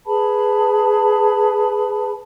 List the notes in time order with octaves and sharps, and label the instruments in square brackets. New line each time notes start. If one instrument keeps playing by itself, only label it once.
[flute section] G#4 B4 A5 B5